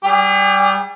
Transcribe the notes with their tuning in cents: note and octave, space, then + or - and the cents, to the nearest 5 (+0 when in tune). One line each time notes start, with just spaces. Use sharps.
G3 -20 G#4 -45